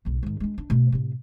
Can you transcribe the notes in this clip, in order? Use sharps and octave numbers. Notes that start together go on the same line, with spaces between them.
B1 G#2
G#2 D#3
G#3 D4
D4
B2 A3
A2 C3